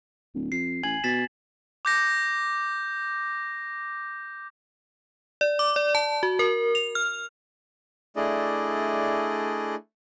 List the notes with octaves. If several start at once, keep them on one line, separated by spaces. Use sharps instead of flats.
D1
F2 C7
A1 G#5 G#6 F#7
B2 A6 B6 E7
D6 G6 A#6
D5
D6
D5
A5
F#4
A#4
F7
F6
A3 D4 E4 G#4 D5 D#5